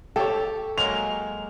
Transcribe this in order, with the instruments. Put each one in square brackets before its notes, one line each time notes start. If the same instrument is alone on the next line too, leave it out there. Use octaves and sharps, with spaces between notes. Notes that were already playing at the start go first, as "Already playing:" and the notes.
[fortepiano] G4 C#5 [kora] A4
[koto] F#3 G#3 A#3 [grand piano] F7